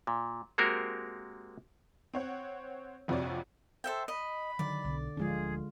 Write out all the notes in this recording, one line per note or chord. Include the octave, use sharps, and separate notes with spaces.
A#2
G#3 A#3 C4 F#4 G4 A#4
C4 C#5 F#5
A#1 F2 C3 F#4 C#5 D5
A4 C5 E5 G5
D#5 B5
D3 D#3 F#3 D5
B1 D3
D1 D3 F3 G#3 D4 F4 G#4